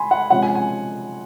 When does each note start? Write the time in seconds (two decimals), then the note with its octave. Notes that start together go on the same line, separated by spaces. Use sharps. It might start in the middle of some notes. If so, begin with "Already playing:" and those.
Already playing: G#5 B5 C6
0.11 F#5
0.30 C3 F3 G#3 C#4 F#5
0.42 G#5
0.55 G#5